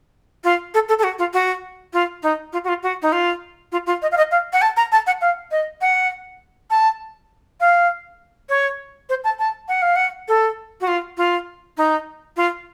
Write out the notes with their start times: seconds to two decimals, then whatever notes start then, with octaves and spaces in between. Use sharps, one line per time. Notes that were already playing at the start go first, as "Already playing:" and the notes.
0.44 F4
0.74 A4
0.89 A4
0.99 A4
1.03 F#4
1.19 F4
1.33 F#4
1.93 F4
2.23 D#4
2.53 F4
2.64 F#4
2.68 F4
2.83 F#4
3.02 D#4
3.12 F4
3.72 F4
3.86 F4
4.02 D#5
4.12 F5
4.17 D#5
4.31 F5
4.53 F#5
4.62 A5
4.77 A#5
4.92 A5
5.07 F#5
5.21 F5
5.51 D#5
5.81 F#5
6.70 A5
7.60 F5
8.49 C#5
9.09 C5
9.24 A5
9.39 A5
9.68 F#5
9.82 F5
9.96 F#5
10.28 A4
10.81 F#4
10.87 F4
11.17 F4
11.77 D#4
12.36 F4